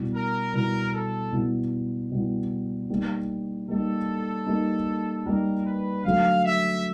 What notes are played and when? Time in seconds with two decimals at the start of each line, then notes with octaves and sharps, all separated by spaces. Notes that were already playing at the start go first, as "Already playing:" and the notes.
Already playing: B2 G3 B3 E4
0.14 A#4
0.53 B2 G3 B3 E4 A#4
0.93 A4
1.32 B2 G3 B3 E4
2.11 B2 G3 B3 E4
2.90 G3 A#3 D#4 G4
3.68 G3 A#3 D#4 G4 A4
4.46 G3 A#3 D#4 G4
5.25 G3 A#3 D#4 G4 A#4
5.65 B4
6.04 D3 F#3 A3 F5
6.43 E5